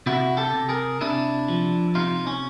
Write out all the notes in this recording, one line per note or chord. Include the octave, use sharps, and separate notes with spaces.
C3 E4 F#4
G4 A4
C3
G#4 A#4
C3 D4 E4
F3
C3 D#4 F4
C#4